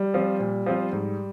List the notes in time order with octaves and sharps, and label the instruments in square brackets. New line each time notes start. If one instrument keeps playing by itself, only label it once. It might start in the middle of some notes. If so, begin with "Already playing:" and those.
Already playing: [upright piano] G3
[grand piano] F3 C4 F4
A#2
F3 C4 F4
G#2